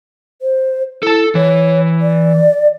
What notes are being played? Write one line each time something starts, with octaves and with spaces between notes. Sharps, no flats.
C5
E4 A4 A5
E3 C#5
D5